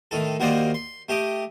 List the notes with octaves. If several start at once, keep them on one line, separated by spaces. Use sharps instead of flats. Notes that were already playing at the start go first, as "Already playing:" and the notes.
A2 D#3 A4
D#2 A#3 F#4 C5 D5 D#5
C6
A3 G4 D#5 D6